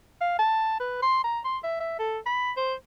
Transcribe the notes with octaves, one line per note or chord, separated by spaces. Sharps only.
F5
A5
B4
C6
A#5
C6
E5
E5
A4
B5
C5